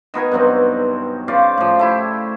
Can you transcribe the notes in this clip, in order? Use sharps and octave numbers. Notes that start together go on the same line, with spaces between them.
D#3 B3 A#4 G#5
G2 B2 F#3 C4
C#3 C5 D5 F5
A2 F3
A3 E4 G4